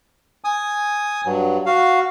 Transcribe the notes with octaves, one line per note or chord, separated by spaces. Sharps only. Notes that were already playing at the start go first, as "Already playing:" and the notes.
G#5 D#6
G2 F#3
F#4 F5